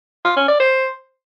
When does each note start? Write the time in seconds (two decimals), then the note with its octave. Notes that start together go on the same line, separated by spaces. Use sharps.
0.25 F4
0.36 C#4
0.48 D5
0.60 C5